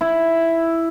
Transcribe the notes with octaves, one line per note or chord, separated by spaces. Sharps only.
E4